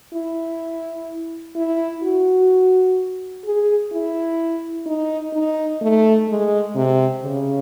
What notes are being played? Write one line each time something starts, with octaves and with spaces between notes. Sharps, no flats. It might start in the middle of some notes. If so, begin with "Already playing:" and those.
E4
E4
F#4
G#4
E4
D#4
D#4
A3
G#3
C3
C#3